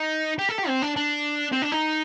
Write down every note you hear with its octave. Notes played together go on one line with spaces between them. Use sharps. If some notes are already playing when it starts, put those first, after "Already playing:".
Already playing: D#4
G4
A4
G4
C4
D4
D4
C4
D4
D#4